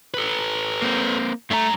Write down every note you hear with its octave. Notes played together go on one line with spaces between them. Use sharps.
A4 B4
A#3 C4
G2 A3 A#5